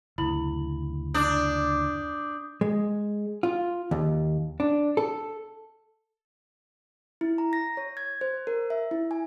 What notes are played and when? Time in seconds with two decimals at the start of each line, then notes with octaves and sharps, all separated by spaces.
0.18 F#1 D2 E4 B5 F#7
1.14 D4 D6 D#6 G6
2.61 G#3
3.43 F4
3.91 D#2
4.60 D4
4.97 A4
7.21 E4
7.38 A#5
7.53 A#6
7.77 C#5
7.97 G#6
8.21 C5
8.47 A#4
8.70 E5
8.91 E4
9.11 G#5